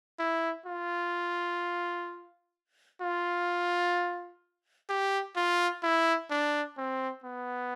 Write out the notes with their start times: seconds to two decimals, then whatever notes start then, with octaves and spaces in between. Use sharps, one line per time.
0.19 E4
0.66 F4
3.01 F4
4.89 G4
5.36 F4
5.83 E4
6.30 D4
6.77 C4
7.24 B3